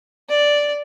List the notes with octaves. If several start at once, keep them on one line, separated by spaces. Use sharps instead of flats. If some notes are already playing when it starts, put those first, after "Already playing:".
D5